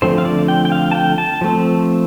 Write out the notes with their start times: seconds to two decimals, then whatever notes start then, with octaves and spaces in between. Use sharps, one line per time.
0.02 D3 F3 A3 C4 C5
0.18 F5
0.25 D5
0.48 G5
0.65 G5
0.72 F5
0.91 A5
0.95 G5
1.18 A5
1.41 F3 A3 C4